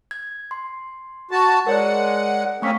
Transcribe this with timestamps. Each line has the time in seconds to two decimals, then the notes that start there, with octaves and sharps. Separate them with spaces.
0.11 G#6
0.51 C6
1.31 F#4 A5
1.67 G#3 A#4 C#5 D5 F#5
2.62 A3 A#3 C4 C#4 C#6 B6